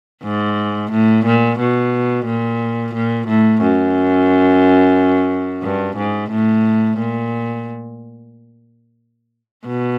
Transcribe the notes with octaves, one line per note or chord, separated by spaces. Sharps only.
G#2
A2
A#2
B2
A#2
A#2
A2
F#2
G2
G#2
A2
A#2
B2